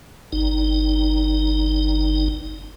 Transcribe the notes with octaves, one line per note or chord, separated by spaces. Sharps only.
G1 D#4